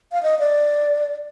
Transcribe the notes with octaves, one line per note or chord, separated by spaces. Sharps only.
F5
D#5
D5